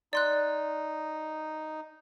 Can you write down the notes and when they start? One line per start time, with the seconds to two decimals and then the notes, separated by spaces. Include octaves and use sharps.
0.13 D#4 D5 C6 F#6